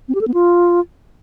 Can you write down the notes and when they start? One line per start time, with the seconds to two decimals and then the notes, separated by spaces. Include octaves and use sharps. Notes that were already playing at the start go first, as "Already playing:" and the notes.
0.08 C4
0.15 G4
0.21 A4
0.27 B3
0.34 F4